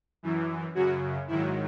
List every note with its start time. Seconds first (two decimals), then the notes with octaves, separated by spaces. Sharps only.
0.23 F#2 E3
0.75 F#2 C#3 F#3 F#4
1.28 G#2 D#3 F#3 E4